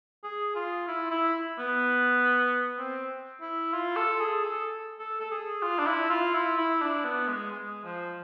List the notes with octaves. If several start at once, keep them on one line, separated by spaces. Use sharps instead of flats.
G#4
F4
E4
E4
B3
C4
E4
F4
A4
G#4
A4
A4
A4
G#4
F4
D4
E4
F4
E4
E4
D4
B3
G#3
G#3
F3